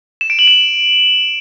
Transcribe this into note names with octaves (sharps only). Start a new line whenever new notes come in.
E7
D7
F#7
E7